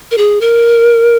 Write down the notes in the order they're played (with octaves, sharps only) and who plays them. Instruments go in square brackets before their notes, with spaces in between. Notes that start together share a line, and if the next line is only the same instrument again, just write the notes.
[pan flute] A#4
G#4
A#4